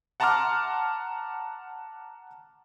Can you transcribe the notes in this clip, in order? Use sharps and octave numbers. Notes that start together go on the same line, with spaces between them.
F#5 A5 A#5 C6 D6 F6